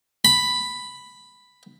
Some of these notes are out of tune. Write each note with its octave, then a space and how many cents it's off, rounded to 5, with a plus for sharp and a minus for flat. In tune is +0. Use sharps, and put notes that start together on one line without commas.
B5 +5